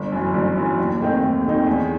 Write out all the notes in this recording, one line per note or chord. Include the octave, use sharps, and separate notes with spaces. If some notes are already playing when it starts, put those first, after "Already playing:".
Already playing: G1
F#2 E3
G1
F#2 E3
D#2
D#3 A3 C4 D#4
D#2
D#3 A3 C4 D#4
E2